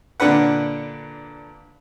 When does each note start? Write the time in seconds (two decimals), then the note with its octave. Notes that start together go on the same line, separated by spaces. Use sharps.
0.20 A#2 D3 D4 B4 F#5